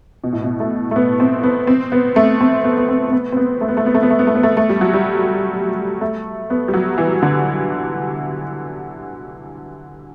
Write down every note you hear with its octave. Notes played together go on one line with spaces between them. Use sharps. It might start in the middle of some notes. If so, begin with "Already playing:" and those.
B2
A2
B2
A3
A3
B3
C4
B3
C4
B3
A3
C4
B3
B3
C4
C4
B3
C4
B3
A3
B3
A3
B3
A3
B3
A3
B3
A3
B3
A3
A3
G3
F#3
G3
A3
B3
G3
F#3
E3
D3